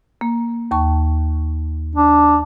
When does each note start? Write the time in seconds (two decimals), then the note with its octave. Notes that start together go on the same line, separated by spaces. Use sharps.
0.21 A#3
0.71 D#2 A5 C#6
1.95 D4